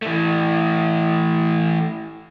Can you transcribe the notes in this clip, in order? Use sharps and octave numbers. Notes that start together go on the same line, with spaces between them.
E3 A3